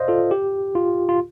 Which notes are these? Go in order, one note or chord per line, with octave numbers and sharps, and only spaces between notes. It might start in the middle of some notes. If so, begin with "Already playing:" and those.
Already playing: C5 D5 D#5 F5
F4 A4
G4
F4
F4